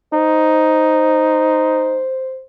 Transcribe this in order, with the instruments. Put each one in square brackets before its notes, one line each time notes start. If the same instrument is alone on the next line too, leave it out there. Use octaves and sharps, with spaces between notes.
[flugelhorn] D#4 [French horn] C5